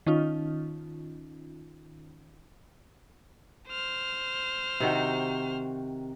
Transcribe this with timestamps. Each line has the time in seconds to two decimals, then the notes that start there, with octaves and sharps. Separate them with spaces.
0.06 D#3 C#4 D#4 F4
3.68 C5 F6
4.80 C3 D#3 F#4